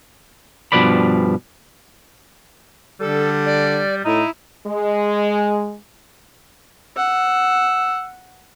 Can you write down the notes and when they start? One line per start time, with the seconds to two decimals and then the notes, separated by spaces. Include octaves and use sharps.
0.72 G2 B2 F3 B4 D5 B5
3.00 D3 G3 A4
3.46 D5
4.05 A2 D#4 E4
4.67 G#3
6.96 F#5 E6